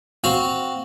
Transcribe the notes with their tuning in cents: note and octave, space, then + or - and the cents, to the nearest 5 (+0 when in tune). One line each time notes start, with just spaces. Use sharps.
C4 +0 F#4 +0 F5 +0